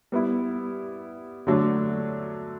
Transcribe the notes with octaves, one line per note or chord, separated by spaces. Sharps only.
G3 B3 E4
D3 F#3 A3 D4